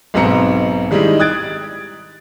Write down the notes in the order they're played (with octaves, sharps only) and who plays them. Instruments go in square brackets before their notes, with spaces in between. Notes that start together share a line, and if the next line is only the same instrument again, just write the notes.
[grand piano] B1 G#2 B2 C4 A#5 C#7
D#3 G3 G#3 D#4 E4
D#6 F#6 G#6 A6 D7